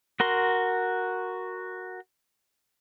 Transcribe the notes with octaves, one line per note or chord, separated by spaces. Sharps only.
F#4 A#4 C6